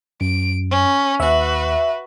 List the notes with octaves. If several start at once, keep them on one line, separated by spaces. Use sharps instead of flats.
F#2 D7
C#4
D#2 F#4 B4 E5